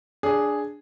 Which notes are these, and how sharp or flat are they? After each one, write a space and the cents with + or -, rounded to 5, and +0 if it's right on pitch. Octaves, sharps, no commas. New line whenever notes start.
D4 +0 G#4 +0 C#5 +35